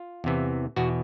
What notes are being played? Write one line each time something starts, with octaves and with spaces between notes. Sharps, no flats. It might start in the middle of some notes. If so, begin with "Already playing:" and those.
Already playing: F4
E2 C3 E3
E2 B2 F#4